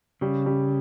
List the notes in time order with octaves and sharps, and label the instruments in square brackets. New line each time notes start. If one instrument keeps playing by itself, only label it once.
[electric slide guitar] C#3 [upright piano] G3
[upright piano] G3